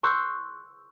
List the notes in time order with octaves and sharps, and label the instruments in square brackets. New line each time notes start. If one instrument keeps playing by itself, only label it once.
[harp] C6 C#6 E6 F#6 G6